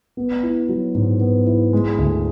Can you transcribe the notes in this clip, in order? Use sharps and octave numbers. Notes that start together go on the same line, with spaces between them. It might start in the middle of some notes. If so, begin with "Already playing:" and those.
B3
E4
F#3
G#2
B3
E4
G#3
D2